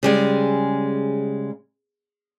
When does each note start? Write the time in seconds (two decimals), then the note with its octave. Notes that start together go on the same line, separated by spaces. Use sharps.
0.03 C#3 G3 G#3